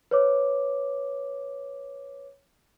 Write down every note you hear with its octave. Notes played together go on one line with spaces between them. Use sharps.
B4 C#5 D6